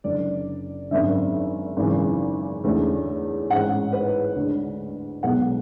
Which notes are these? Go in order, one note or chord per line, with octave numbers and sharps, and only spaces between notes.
F#1 F#2 D3 D5
G#1 F#2 D3 E5
G#1 F#2 C#3 E3
E2 D3 A3 C#4
A1 G#2 G#3 C#4 F#5
B4
D2 D3 G#3
B1 B2 G#3 B3 F#5